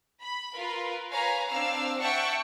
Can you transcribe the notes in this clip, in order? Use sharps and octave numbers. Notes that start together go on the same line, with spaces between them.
B5
F4 A#4 B4
B4 C#5 F5 G#5 A#5
C4 D4 F5 E6
E5 F#5 G5 A5 C#6